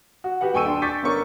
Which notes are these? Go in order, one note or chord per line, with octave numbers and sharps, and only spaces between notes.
F#4
F#4 G4 B4 F#5
D#1 G5 G#5 C#6 E6 D#7
D4 G5 C6
C#6 D6 G6 A6 B6
G1 C#4 A#4 C#6